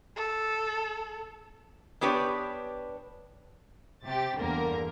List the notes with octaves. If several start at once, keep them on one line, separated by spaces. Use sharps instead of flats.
A4
B3 D4 G4 B4 C#5
C3 G4 A6
E2 G2 D3 A#3 A#4 A#5